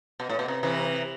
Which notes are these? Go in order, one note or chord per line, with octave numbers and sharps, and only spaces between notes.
B2
A2
B2
C3
C3 E3